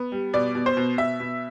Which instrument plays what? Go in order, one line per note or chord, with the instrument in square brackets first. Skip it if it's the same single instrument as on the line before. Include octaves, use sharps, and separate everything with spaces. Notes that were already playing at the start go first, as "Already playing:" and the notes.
Already playing: [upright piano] B3
G3
B2 D5
B2
C5
B2
B2 E5
B2